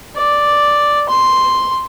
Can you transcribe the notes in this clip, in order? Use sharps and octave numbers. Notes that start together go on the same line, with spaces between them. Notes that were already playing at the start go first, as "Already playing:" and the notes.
D5
C6